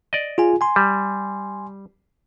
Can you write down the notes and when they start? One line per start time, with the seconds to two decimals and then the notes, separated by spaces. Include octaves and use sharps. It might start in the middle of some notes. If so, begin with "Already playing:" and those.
0.13 D5 D#5
0.38 F4 G#4 G#5
0.61 G#5 C6
0.76 G3